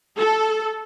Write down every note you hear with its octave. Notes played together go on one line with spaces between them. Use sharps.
A4